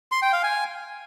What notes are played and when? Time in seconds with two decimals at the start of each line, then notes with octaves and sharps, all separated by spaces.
0.12 C6
0.22 G5
0.33 F5
0.43 G#5